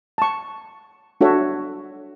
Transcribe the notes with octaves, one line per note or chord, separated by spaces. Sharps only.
A5 C#6
D4 F#4 A4 C#5 E5